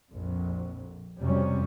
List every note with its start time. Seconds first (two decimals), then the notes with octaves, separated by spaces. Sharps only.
0.13 A#1 F2
1.19 F2 C3 F#3 G3 C#4